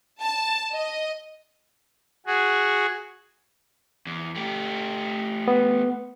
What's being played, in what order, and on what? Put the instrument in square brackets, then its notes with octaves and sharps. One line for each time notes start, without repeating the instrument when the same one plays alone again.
[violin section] A5
D#5
[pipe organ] F#4 G#4
[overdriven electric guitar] E2
A3 G4
[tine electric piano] B3